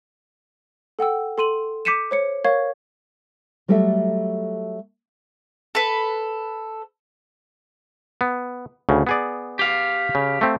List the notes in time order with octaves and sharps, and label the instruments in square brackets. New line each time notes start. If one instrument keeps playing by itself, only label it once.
[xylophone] A4 F#5 G5 E6
A4 C6 D#7 F#7
D6 G6 B6 C#7 D#7 E7
C5 C#5 C#7
A#4 C#5 F5 C#6 G#6
[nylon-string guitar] F#3 G3 A3 A4 D5 E5
[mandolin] A4 B4
[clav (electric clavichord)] B3
D2 C#3
B3 G#4 D5
[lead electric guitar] G4 F5
[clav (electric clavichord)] C#3
A3 C4